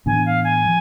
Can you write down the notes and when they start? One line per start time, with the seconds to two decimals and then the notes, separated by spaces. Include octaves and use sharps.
0.06 A2 E3 B3 D4 G#5
0.26 F5
0.44 G#5
0.65 F3